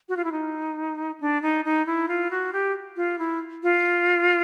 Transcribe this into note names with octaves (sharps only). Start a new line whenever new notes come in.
F#4
F4
E4
D#4
D4
D#4
D#4
E4
F4
F#4
G4
F4
E4
F4